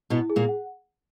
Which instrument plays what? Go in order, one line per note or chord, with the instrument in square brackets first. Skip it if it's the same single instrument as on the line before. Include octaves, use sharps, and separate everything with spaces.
[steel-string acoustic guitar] B2 B3 [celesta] E4
[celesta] G#4
[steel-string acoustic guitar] A#2 A#3
[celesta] F#5